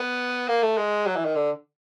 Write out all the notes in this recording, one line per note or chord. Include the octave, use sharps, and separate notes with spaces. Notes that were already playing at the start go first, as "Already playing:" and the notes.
Already playing: B3
A#3
A3
G#3
F#3
E3
D#3
D3